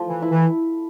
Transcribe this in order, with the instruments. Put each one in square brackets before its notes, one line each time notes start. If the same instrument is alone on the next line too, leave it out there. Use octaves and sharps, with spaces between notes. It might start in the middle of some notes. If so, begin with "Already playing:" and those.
Already playing: [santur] F3 A3
[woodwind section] E3
[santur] E4
[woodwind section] E3